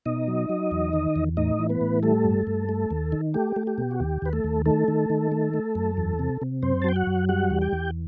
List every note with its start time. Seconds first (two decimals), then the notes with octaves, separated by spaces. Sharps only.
0.06 B2 D#4 D#5
0.28 F#3
0.49 F#3
0.71 E2
0.93 D#3
1.16 E2
1.37 A2 D#4 D#5
1.59 E3
1.69 B3 B4
1.81 A2
2.03 G3 A3 A4
2.25 G2
2.47 G2
2.69 A3
2.90 D#2
3.12 D#3
3.34 A3 G4
3.56 A3
3.67 G4
3.78 B2
3.91 F#4
4.00 D#2 G4
4.22 D#2 B4
4.33 A3 A4
4.44 D#2
4.66 D#3 A3 A4
4.88 D#3
5.10 D#3
5.32 A3
5.54 A3
5.75 F#2
5.97 E2
6.19 C3
6.42 C3
6.62 F#2 C4 C5
6.82 A5
6.84 F#3 G5
6.96 F#4 F#5
7.07 F#2
7.29 G3 F#4 F#5
7.50 E2
7.61 G4 G5
7.72 E2